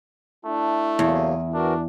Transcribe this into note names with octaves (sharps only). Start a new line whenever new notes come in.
A3 D4 E4
E2 C3 F#3 A#3
E3 D4 F#4 A#4